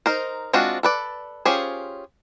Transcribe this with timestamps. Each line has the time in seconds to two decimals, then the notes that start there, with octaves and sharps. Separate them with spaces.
0.06 D#4 A#4 C5
0.53 G#3 C4 D4 F4 F#4
0.83 A4 B4 D5
1.45 C#4 F4 G4 G#4 C5